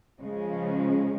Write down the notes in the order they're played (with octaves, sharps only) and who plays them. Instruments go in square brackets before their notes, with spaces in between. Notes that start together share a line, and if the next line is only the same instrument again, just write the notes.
[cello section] C#3 F3 G#3 C#4